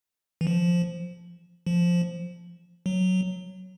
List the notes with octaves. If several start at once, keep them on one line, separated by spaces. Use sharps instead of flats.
E3
F3
F3
F#3